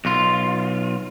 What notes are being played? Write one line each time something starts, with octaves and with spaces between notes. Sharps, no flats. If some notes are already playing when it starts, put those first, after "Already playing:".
B1 F4